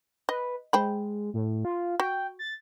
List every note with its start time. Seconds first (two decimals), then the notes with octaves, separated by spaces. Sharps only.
0.29 B4 D#5
0.73 G#3 C5 G5 B5
1.34 A2
1.65 F4
2.00 F#4 G5
2.39 A6